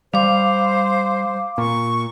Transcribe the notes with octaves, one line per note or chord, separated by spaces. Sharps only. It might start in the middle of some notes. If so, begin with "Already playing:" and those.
G3 C5 F5 D6
A#2 C#6